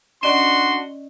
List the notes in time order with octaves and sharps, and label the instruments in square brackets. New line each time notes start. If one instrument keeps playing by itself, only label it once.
[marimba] C#4 D5 D#5 [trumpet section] D4 F#4 C6